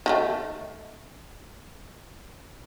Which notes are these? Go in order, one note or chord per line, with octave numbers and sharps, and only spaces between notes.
D#3 F3 A3